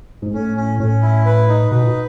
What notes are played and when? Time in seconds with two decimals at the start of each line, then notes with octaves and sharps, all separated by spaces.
0.22 G#2
0.33 A2 C#4
0.57 C#4
0.79 A2 C#4
1.02 E4
1.26 B4
1.49 D#4
1.71 B2 B4
1.83 A2
1.87 B2